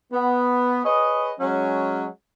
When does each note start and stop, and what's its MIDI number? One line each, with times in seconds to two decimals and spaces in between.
0.12 0.81 59
0.85 1.32 68
0.85 1.32 71
0.85 1.32 73
0.85 1.32 75
1.40 2.07 54
1.40 2.07 56
1.40 2.07 61